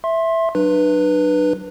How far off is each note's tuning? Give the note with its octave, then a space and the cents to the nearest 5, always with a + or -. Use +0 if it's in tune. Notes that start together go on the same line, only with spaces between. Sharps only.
E5 +0 C6 +25
F#3 +20 D4 +40 B4 -10